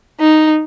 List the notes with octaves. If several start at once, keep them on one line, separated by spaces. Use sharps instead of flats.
D#4